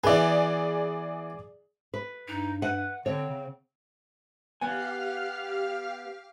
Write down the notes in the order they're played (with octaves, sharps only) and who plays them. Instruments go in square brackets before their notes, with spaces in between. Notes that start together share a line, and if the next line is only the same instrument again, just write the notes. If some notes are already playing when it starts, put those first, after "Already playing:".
[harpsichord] E3 B3 [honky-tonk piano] G#4 D5
[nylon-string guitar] B4
[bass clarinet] G2 [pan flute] D#4
[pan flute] B4 [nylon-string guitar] F#5
[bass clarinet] D3 [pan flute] C4 [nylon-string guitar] C#5
[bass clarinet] C#3
[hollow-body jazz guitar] B3 G#5 [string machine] G4 F5 F6